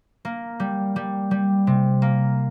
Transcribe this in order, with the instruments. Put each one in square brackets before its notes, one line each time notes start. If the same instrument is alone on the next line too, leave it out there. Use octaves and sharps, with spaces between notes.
[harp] A#3
G3
G3
G3
C3
A#3